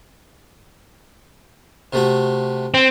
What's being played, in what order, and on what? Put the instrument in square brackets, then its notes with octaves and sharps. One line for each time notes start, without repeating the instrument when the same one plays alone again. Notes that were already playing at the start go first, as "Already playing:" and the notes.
[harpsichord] C3 A3 F#4
[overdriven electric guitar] C4